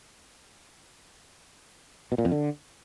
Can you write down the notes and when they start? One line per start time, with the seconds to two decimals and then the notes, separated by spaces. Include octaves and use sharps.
2.12 B2
2.18 A#2
2.25 F2
2.32 D3